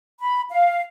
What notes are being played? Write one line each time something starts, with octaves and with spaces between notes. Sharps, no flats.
B5
F5